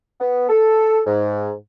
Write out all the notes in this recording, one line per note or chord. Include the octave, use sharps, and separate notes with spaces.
B3
A4
G#2